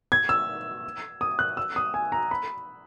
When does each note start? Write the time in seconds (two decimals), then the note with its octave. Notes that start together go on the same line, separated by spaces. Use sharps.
0.12 G#6
0.29 E6
1.21 D#6
1.39 F#6
1.57 E6
1.76 D#6
1.94 G#5
2.12 A#5
2.31 B5